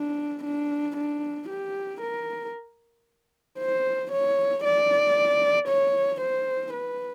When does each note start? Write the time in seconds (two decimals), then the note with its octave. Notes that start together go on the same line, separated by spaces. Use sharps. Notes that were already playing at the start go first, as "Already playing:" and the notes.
Already playing: D4
0.44 D4
0.97 D4
1.50 G4
2.02 A#4
3.59 C5
4.12 C#5
4.65 D5
5.68 C#5
6.21 C5
6.74 B4